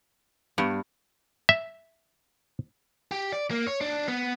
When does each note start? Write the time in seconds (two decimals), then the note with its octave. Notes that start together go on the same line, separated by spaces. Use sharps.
0.58 G2 B3 G4
1.49 E5
3.11 G4
3.33 D5
3.51 A#3
3.67 C#5
3.81 D4
4.08 B3